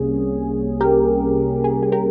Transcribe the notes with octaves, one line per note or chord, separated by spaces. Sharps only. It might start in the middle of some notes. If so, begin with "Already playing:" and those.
Already playing: C2 C3 G3 A#3 C#4 G#4
G4 A#4
G#4
G#4
G4 A#4